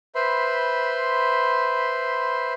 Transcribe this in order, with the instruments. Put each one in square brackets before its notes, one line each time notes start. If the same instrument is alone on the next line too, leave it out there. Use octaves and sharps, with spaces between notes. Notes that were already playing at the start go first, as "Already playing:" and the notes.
[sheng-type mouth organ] B4 C5 E5 B5 C6